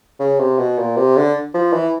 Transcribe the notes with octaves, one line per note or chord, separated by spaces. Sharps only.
C#3
C3
B2
A#2
C3
D3
F3
E3